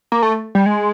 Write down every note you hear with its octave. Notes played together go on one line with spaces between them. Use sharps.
A#3
A3
G3
G#3